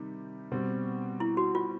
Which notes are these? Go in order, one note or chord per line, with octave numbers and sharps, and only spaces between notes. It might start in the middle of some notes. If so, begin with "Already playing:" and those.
Already playing: C3 D#3 G3 D#4
B2 G3 C4
E4
F#4
F4